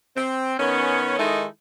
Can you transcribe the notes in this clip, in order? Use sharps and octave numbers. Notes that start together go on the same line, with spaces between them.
C4
D#3 B3 C#4
D#3 G#3 D#4 E4 A4